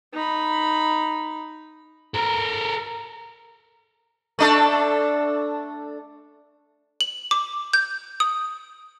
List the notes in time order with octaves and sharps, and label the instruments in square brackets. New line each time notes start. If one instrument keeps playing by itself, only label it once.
[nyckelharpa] D#4 B5
[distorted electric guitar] A4 A#4
[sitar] A3 D4 A4
[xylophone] F#7
D6
G6
D#6